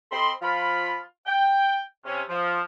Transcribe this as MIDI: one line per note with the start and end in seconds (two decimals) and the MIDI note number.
0.11 0.31 60
0.11 0.31 69
0.11 0.31 75
0.11 0.31 83
0.11 0.31 84
0.42 0.98 53
0.42 0.98 65
0.42 0.98 83
1.26 1.78 79
2.05 2.22 48
2.05 2.22 61
2.28 2.62 53